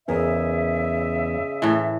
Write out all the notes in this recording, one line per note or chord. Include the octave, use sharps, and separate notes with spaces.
E2 C#3 A#4 C5 D#5 E5
A2 E3